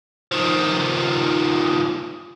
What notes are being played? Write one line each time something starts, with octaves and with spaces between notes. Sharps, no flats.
D#3 F3